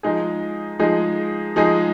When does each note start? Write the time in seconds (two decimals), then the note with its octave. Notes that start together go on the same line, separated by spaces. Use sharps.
0.03 F3 G#3 D#4 G#4
0.79 F3 G#3 D#4 G#4
1.56 F3 G#3 D#4 G#4